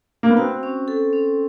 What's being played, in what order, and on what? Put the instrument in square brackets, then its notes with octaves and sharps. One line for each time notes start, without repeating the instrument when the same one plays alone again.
[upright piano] A#3
B3
[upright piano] C4 [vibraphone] F#4
[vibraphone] C#4
A4
C#4